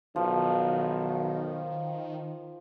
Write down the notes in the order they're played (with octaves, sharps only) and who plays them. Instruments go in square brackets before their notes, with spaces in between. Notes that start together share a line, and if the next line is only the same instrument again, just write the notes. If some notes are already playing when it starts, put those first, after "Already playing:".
[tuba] B1 [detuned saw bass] D#3 [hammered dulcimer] F3